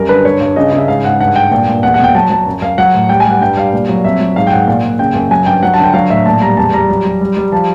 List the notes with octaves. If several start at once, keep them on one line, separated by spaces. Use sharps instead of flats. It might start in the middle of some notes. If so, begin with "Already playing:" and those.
Already playing: F#2 G3 A#4
D3 B4
G2 C#5
G2
C#3 D#5
C#3 E5
G#2 F5
G#2 F#5
G2 F#5
G2 G5
A#2 G5
A#2
E2 F#5
F#5
B2 G5
F#3 A5
F#3 A5
F#2
F#2 F5
F#3 F#5
A2
G3 G5
G#5
G3 F#5
G2 G5
G3 F5
A#2
F#3
F2 E5
F#3
G#2 F5
G5
G#2 F#5
A#2
A#2
C#3 G5
F#2
F#3 G#5
G2 G5
F#3 F#5
A5
D3 G5
F#3 F5
A2 E5
A#2 A5
G3 A#5
E2 A5
G3 A#5
F#3
F#3
G3
G3
F3 A5